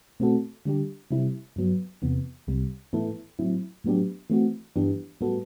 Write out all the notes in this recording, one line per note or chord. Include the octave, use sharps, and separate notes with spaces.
B2 A3 C4 F#4 A4
D3 G3 D4 G4
C3 G3 C4 E4
G2 F#3 B3
E2 C3 E3 B3
C2 C3 G3
A2 E3 B3 E4 A4
A2 F#3 C4 E4
A2 F#3 B3 D4 G4
E3 A3 C4 F#4
G2 E3 B3 D4 G4
A2 G3 B3 F#4 A4